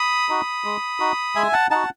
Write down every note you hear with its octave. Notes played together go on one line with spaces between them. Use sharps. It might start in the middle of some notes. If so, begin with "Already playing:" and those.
Already playing: B5 D#6
D#4 F#4
G#3
D#4 F#4
G#3 E5 G#5
F#5 A5
D#4 F#4 F#5 A5